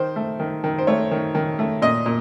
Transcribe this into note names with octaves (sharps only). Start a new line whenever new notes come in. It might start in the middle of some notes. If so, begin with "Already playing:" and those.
Already playing: D#3 C5
A3
D#3
D#3
C5
A3 C#5
D#3
D#3
A3
A#2 D#5
A#2